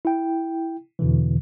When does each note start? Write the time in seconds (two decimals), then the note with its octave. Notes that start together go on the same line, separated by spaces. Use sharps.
0.05 E4 G5
0.99 E2 B2 D3 E3